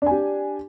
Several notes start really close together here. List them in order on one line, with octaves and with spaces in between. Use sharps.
D4 G#5 G4